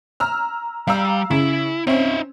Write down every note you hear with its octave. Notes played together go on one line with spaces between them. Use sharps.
A#5 E6 F6
G3 F5 A#5 E6
C#3 E4
C4 C#4 D#4 E5